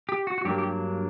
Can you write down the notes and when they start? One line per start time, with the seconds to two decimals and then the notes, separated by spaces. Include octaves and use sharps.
0.09 G4
0.27 F#4
0.38 F#4
0.45 G2 F#3 A#3 D4 G4
0.58 G4